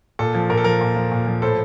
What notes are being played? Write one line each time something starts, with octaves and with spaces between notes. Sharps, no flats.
A#2 A4
F3
A#2 A#4
A4
F3 A#4
A#2
F3
A#2
F3
A2 A4 C5